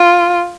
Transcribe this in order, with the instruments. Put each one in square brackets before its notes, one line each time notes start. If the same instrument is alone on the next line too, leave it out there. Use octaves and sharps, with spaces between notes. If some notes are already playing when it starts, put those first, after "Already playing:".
Already playing: [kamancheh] F4